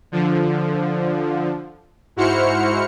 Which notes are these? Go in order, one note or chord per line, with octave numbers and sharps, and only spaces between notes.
D3 F3
G#2 E4 F#4 C5 F6 C#7